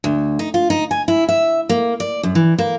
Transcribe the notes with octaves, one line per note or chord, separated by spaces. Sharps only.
D2
D#4
F4
D#4
G#5
E4
E5
A#3
D5
F#2
E3
A#3